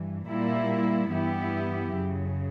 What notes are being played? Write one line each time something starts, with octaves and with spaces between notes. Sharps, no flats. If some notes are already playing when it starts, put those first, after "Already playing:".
Already playing: G2 E3
A#2 G3 A#3 E4
G2 E3 B3 E4 G4
F#2 C#3 F#3